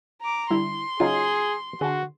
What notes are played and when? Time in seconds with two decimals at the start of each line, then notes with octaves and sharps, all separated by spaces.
0.22 A#5 D6
0.50 D3 G3 E4 C6
1.00 C#3 F#3 D#4 F4 G#4
1.81 D3 F#4 G#4 A5